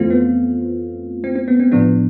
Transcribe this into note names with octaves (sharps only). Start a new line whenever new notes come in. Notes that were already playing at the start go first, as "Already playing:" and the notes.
Already playing: F2 E3 A3 C4 F4
B3
C4
C4
B3
C4
A2 F3 B3 D4